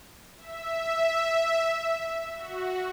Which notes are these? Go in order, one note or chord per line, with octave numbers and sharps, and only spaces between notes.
E5
F#4